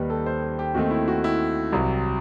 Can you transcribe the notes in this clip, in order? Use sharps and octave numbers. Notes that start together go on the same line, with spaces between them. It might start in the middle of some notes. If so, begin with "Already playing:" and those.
Already playing: D#2 D#3 G3 B4
A4
C5
A4
G4
D#2 D#3 A3 C4 F#4
E4
F#4
E4
C2 C3 F#3